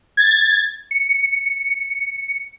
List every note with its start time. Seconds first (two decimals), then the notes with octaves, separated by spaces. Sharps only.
0.17 G#6 A6
0.91 C#7